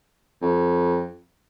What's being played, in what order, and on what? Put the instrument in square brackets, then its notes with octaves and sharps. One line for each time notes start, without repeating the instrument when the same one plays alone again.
[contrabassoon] F2